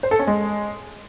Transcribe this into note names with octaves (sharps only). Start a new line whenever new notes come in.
C5
A4
C#4
G#3